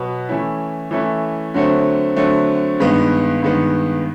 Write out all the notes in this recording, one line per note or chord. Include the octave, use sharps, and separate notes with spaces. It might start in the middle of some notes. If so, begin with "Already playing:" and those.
Already playing: B2 F#3 B3
E3 A3 C#4 E4
E3 A3 C#4 E4
D3 F#3 A3 C4
D3 F#3 A3 C4
G2 D#3 G#3 B3
G2 D#3 G#3 B3